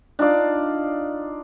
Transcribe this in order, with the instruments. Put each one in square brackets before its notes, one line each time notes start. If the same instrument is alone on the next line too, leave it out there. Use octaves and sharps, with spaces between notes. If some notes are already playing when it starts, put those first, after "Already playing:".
[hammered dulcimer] D4 D#4 F4 D5